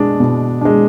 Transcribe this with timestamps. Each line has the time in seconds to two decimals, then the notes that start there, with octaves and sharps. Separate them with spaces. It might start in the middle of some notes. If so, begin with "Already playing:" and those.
Already playing: B2 G#3 D4
0.20 B2
0.61 G#3 D4